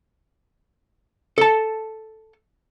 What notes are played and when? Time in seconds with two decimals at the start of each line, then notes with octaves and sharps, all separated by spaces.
1.38 A4 A5